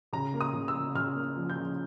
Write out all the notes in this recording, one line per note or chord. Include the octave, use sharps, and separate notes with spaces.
C#3 A#5
A#3
D#6
C#3
E6
C#3
C#3 F6
A#3
F3
G6
C#3